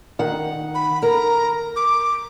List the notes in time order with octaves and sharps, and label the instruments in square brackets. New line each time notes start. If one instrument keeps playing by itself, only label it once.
[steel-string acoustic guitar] D#3 F#5
[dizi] B5
[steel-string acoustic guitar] A#4 [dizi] A#5
[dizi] D6